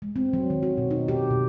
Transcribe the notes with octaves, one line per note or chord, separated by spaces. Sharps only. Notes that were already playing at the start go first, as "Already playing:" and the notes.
G#3
C4
F#3
D#3
F#4
B2
D#4
G4
B2